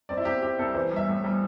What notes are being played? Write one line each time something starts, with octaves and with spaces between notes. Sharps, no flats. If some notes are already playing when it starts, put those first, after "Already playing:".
C4 D5
E4
C4 G4
C4 G4
C2 A4
E3 C5
G3
E5
A2
G3